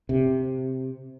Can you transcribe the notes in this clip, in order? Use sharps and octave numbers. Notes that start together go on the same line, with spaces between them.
C3